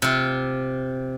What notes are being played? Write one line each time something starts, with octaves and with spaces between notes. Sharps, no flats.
C3 F4